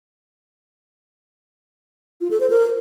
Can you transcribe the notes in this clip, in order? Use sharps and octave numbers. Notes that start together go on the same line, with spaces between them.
F4
A4
C5
A#4